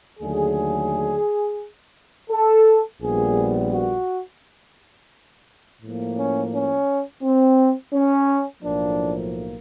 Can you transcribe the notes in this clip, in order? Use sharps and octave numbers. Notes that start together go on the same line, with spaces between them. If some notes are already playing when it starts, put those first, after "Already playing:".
D#2 D3 F#3 A3 G#4
A4
A#1 A#2 G3 B3 G#4
F#4
A2 F3 A#3
C#4
C#4
C4
C#4
B1 A2 F3 A#3 D4